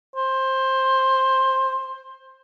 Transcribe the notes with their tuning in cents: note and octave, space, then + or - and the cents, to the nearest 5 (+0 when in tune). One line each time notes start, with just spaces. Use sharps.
C5 +15